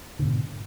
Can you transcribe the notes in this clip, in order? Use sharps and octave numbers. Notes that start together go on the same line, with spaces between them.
G#2 B2 D3